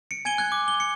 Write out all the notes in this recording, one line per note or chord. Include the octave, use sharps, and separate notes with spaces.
C#7 D7
G#5 G#6 D7 D#7 G7
F#6 G#6
D6
G7
C#7